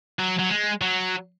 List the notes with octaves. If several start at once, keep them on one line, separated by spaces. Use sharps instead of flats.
F#3
F#3
G#3
F#3